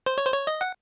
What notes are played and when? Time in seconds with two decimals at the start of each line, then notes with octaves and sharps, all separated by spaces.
0.06 C5
0.18 C#5
0.25 C5
0.33 C#5
0.47 D#5
0.61 F#5